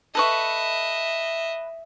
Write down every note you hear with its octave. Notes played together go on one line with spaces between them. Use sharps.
A4 B4 D#5 E5 C#6